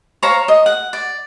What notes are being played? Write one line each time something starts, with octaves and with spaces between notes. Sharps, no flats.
C5 C#5 F5 A#5
D#5
F#5
D5